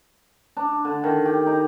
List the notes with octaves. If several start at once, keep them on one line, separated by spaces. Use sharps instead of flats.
D4
D3
D#3
G4
D#4